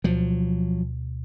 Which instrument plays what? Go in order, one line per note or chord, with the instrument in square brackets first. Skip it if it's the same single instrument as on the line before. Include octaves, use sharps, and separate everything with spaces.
[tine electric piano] D2 B2 [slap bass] F3 F#3